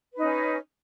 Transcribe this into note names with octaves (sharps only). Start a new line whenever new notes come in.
C#4 D#4 B4